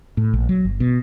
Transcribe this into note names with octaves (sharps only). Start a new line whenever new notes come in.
A2
A#1
F#3
G1
B2